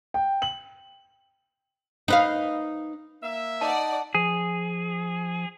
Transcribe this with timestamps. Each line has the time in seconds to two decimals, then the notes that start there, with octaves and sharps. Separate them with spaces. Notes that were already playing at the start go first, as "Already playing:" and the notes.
0.14 G5
0.42 F#7
2.08 D#4 B4 F5
3.23 A#3 E5
3.61 D#4 D5 F#5 A5
4.15 F3 G#4